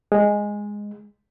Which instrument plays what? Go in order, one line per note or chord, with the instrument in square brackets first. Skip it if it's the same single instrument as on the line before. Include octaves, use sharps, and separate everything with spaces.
[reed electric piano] G#3